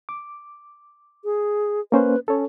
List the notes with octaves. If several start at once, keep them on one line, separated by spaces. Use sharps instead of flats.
D6
G#4
A#3 C#4 B4 C5
C#4 A4 C#5